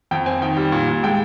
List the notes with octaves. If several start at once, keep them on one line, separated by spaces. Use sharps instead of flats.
F2 G5
C4 G#5
D#3 G5
G3
A#2
A#2
G#3 G5